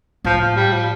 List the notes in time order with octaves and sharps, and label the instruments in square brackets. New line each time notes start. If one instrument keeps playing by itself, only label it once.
[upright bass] A2 [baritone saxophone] F3
[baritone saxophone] F3
G3
F3